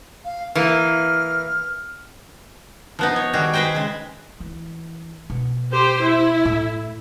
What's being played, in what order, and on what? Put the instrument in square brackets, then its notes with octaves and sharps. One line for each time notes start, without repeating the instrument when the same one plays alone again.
[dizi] F5
[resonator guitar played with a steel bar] E3 A#3 [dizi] F6
[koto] F3 B3 D#4
C#5
D#3 G3 F#4 G#4
G#4 B4 C5 D#5 G5
C#3 G#3
[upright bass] E3
B2
[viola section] G4 C5
E4
[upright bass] A2